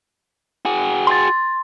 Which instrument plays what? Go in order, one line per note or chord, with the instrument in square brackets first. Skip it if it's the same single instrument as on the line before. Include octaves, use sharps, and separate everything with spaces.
[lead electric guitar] F#4 G#4
[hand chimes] C6 A6